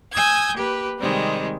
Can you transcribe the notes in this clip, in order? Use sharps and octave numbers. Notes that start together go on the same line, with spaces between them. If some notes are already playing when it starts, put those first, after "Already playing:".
G#5 D#6 E6 G6 G#6
A#3 G4 B4
C3 D#3 G3 G#3 C4